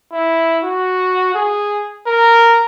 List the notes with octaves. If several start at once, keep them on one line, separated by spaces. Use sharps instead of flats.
E4
F#4
G#4
A#4